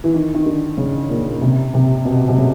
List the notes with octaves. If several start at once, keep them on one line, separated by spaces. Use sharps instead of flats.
E3
D#3
D#3
D3
C#3
A#2
C3
C3
B2
C3
C#3